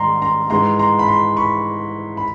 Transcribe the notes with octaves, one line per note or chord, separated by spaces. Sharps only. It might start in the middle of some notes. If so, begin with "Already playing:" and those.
Already playing: G#2 D#3 G3 A#5 C6
A#5 C6
G#2 E3 G#3 A#5 C6
A#5 C6
B5
A#5 C6
B5 C#6
B5